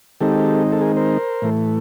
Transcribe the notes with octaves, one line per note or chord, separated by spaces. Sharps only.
D#3 G#3 C4 D#4 G4 A4
A4
G#4 A#4
A#4 C5
A2 E3 A3